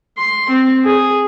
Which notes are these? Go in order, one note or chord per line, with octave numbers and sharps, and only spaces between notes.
C6
C4
G#4